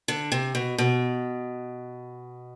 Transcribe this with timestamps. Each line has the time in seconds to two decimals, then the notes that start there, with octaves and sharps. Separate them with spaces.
0.08 D3
0.32 C3
0.55 B2
0.78 B2